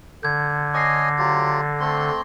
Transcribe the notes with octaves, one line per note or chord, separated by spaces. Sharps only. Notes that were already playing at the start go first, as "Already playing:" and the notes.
D3 G6 G#6
C#5 D#5 G#5 D6 A#6 C7
F#3 F4 G4 A6
A3 C4 C6